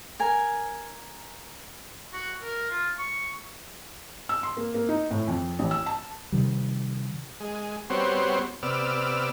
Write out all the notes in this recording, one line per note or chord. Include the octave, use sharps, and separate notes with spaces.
A#4 G#5
F#4
A#4
F4
C#6
E6
C6
A#3
A#3
D#4
A2
F2
A1
E6
A5
C3 D#3 G3
G#3
G3 B3 C4 F#4 C5 C#5
C3 B3 D5 E6 F6